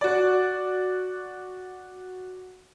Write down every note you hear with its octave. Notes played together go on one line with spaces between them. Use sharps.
F#4 D5